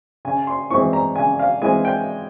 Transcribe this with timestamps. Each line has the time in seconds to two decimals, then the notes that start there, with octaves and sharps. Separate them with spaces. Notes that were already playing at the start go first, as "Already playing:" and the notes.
0.25 C#3 G#5
0.47 C6
0.70 E3 G#3 C4 E4 C#6
0.93 A#5
1.16 C#3 G#5
1.39 F5
1.62 E3 G#3 C4 E4 G#5
1.85 G5